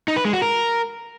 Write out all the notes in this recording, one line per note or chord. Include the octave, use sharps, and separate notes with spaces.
D#4
B4
G#3
F#4
A#4